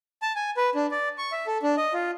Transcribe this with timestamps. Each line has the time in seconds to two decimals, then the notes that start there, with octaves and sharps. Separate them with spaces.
0.22 A5
0.35 G#5
0.57 B4
0.75 D4
0.91 D5
1.18 C#6
1.32 E5
1.47 A4
1.63 D4
1.77 D#5
1.93 F4